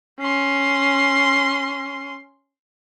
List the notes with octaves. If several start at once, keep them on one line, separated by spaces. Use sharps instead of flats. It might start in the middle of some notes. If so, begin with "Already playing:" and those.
C#4 C6